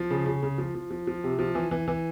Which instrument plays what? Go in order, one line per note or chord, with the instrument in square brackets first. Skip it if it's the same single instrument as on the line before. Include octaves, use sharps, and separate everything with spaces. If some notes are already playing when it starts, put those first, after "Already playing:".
Already playing: [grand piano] F3
C#3
C#3
C#3
F3
F3
F3
F3
C3
F3
E3
E3
E3